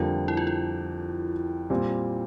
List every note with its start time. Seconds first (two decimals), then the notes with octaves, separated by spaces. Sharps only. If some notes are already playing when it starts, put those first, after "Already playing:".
Already playing: F2 D3 G3 A#3 F4
0.28 E4
0.37 F4
0.47 E4
1.70 A#2 G3 C4